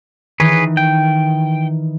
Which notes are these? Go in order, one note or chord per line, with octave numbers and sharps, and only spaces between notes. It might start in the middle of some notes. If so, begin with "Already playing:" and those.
D#3 E3 G#4 B4 C#5
G5